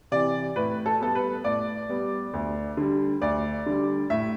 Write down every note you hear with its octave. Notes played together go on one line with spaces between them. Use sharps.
C3 E3 D5
A2 B4
A4
G3 B3 A4
B4
A2 D5
G3 B3
D2
D3 G3
D2 D5
D3 G3
A2 E5